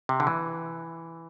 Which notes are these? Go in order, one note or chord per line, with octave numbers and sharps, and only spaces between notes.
C3
D3
E3